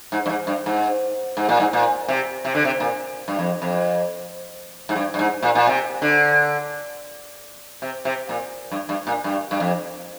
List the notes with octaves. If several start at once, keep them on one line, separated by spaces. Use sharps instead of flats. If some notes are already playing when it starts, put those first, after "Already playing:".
G#2
G2
G#2
G2
G#2
G#2
A#2
G#2
A#2
C3
C3
D3
C3
A#2
G2
F2
F2
G#2
G2
G2
G#2
A#2
A#2
C3
D3
C3
C3
A#2
G2
G2
A#2
G2
G2
F2